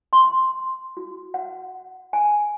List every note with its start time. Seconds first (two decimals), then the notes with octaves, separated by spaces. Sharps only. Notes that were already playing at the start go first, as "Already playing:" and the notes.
0.13 C6
0.97 F#4
1.34 F#5
2.13 G#5